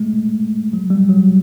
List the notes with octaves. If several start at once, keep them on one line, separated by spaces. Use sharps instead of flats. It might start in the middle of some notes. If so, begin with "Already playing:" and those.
Already playing: G#3 A3
F#3
G3
F#3